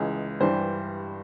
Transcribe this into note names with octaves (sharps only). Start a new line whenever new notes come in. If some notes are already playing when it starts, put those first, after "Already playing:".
Already playing: C#2 C#3 E3 G#3
G2 E3 G3 C5